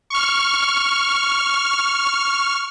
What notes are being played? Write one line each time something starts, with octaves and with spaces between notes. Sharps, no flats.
C#6 F6